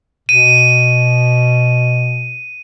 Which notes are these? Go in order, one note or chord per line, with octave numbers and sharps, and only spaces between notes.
B2 D#7